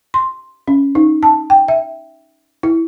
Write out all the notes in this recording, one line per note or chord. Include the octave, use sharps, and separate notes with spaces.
C6
C#4
D#4
A5
G5
E5
E4